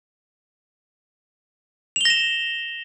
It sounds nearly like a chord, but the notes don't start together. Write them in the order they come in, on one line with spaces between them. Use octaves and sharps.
F7 G7 A#6 E7